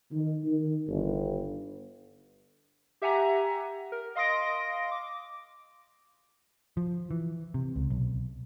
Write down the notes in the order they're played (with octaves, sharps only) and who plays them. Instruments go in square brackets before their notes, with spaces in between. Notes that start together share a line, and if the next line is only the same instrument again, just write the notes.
[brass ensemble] D#3
D#3
G1
[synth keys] G4 E5 F#5 G#5 A#5
A#4
D#5 F5 C6 D#6 A#6 D7
D6
[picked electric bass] F3
E3
C3
C#2
B1